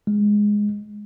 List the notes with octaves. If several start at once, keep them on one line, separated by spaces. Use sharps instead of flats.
G#3